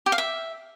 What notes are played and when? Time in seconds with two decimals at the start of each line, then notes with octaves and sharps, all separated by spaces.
0.06 G4
0.12 F5
0.18 E5